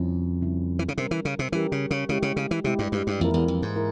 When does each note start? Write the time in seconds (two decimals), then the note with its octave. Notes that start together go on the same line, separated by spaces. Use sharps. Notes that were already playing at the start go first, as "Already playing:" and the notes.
Already playing: F2 C#3 G3 C#4 E4
0.41 C#3 G3 C#4 E4
0.79 E3
0.88 C#3
0.98 C3 G3 C#4 G4 A#4
1.11 E3
1.25 C#3
1.39 C3
1.52 E3 G3 C#4 G4 A#4
1.72 C#3
1.91 C#3
2.09 C#3 G#3 E4 G4
2.22 C#3
2.36 C#3
2.51 E3
2.64 C3 G#3 E4 G4
2.79 G2
2.92 G2
3.07 G2
3.20 F2 E3 A#3 E4 A#4
3.34 E2
3.48 F2
3.62 G#2
3.76 E4 A#4